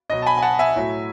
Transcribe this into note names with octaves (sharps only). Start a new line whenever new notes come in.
B2 F#3 D#5
A5
G#5 B5
G#5
F#5 A5
E5 G#5
A2 F#3